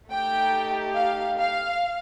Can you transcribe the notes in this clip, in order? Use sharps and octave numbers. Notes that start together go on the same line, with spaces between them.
A3 D#4 G4 G5
F5
F5